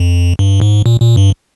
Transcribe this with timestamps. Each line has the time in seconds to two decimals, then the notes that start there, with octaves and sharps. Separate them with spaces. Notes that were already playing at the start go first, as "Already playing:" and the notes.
Already playing: F2
0.39 G2
0.61 G#2
0.86 A#2
1.01 A#2
1.17 G2